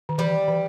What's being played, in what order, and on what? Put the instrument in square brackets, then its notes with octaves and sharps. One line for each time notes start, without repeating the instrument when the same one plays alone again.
[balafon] D#3
[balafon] E3 [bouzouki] G3
[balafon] E3